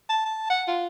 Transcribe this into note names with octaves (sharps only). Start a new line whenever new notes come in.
A5
A5
F#5
F4